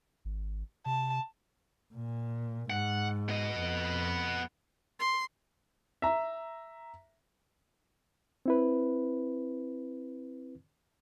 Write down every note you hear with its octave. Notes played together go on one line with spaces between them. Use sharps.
G#1
C3 A5
A#2
G#2 F#5
B3 D#5
F2
C6
E5 A#5
C4 E4 B4